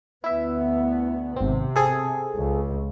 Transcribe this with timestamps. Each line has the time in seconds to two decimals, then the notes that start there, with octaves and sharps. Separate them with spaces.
0.24 D2 B3 E4 E5
1.36 G#1 C3 C4
1.76 C4 G#4 A4
2.36 C#2